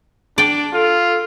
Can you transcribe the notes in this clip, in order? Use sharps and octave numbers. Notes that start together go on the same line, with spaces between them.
D4 D5 G5
F4 A4